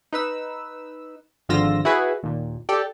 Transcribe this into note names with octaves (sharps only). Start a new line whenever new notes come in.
D#4 B4 E6
G#1 D3 F3 F4 E6 A#6
E4 F#4 G#4 B4
D#2 A#2
G4 A4 D5 G5